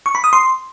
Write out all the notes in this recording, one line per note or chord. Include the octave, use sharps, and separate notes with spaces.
C#6
B5
D#6
C6